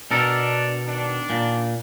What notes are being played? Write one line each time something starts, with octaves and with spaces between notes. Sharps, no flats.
B2 D4 A4 A#4
D#3 D4
A#2